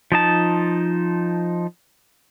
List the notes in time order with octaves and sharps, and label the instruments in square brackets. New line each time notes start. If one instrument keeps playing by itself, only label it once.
[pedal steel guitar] F3 D#4 A5